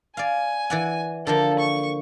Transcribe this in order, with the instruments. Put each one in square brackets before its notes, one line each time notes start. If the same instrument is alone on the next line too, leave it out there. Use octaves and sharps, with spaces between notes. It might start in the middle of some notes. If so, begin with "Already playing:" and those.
[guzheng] D5 F5 [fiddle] G#5
[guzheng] E3 D5 F#5
[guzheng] D3 F3 A#3 [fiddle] A4
[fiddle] C#6